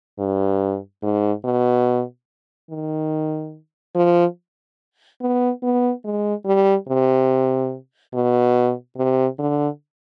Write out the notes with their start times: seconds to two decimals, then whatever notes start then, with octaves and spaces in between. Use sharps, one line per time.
0.19 G2
1.03 G#2
1.45 B2
2.70 D#3
3.96 F3
5.21 B3
5.63 B3
6.05 G#3
6.46 G3
6.88 C3
8.14 B2
8.97 C3
9.39 D3